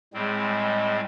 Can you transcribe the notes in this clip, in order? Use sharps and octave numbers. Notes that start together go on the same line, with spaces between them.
A2 G3 G#3 C4